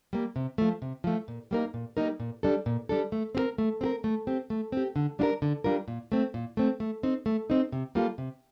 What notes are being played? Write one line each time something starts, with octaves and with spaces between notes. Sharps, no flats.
G3 A#3
C3
F3 A3
C3
F3 A3
A#2
G3 A#3 D#4 A#4
A#2
G3 A#3 D#4 A#4
A#2
G3 D4 A4
A#2
G3 D4 A4
A3
C4 G4 A#4
A3
C4 G4 A#4
A3
C4 G4
A3
C4 G4
D3
G3 D4 F4 A#4
D3
G3 D4 F4 A#4
A#2
A3 C4
A#2
A3 C4
A3
C4 D#4
A3
C4 D#4
C3
G3 A#3 F4 A4
C3